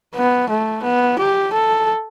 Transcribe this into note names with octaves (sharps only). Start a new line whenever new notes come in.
B3
A3
B3
G4
A4